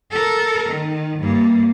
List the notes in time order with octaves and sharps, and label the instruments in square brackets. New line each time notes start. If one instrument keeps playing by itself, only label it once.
[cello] A4 A#4
D#3
G2 A#3